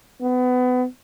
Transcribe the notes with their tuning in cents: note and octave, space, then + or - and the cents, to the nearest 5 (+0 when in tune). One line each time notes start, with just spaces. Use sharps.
B3 +25